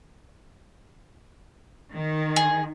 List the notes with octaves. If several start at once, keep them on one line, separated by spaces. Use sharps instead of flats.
D#3
G#4